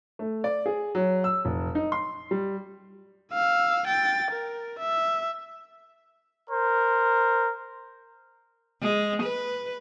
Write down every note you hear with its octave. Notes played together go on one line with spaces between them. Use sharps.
A3
D5
G#4
F#3
E6
F1
D#4
C6
G3
F5 E6
G5 A6
A#4
E5
A#4 C5
G#3
B4